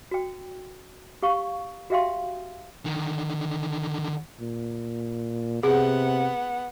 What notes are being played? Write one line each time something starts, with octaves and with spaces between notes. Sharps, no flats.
F#4 G5
G4 F5 C#6
F#4 G4 E5 F5 G5 C6
D3 D#3
A#2
C3 B3 G#4 F#5